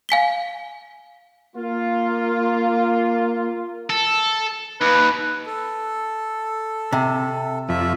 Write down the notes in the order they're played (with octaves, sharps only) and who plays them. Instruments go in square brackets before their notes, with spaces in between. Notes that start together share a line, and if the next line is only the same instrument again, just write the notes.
[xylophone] F5 G#5 B6 G7
[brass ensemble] A#3 F4
[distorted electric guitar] A4
[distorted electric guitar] D#2 [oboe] B4
[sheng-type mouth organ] A4
[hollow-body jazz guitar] C3
[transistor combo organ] F2 [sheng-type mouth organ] E5